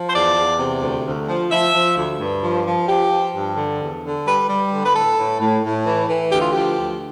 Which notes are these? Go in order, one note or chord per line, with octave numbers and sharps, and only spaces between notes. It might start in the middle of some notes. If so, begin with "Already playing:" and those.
Already playing: F3
C5
E2 D5
E2
C3
D2
D2
F3
F3 E5
F3
D2
G2
F3
F3
F3 G4
F3
G2
D3
E2
D3
G3 B4
G3
D3
B4
A2 A4
A2
A2
A2
E3
E3
D2 G4
F4
F3 G4
D2